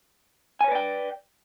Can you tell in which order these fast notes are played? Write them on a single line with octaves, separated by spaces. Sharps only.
G#5 C#5 B4 D5 G5